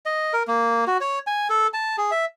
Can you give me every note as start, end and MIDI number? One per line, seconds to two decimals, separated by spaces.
0.06 0.33 75
0.33 0.43 70
0.48 0.85 58
0.87 0.98 66
1.01 1.19 73
1.27 1.48 80
1.50 1.67 69
1.73 1.96 81
1.98 2.11 68
2.11 2.25 76